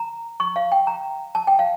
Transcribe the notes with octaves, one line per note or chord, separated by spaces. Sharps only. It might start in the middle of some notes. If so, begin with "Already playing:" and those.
Already playing: A#5
C#6
F5
G5
A#5
A5
G5
F5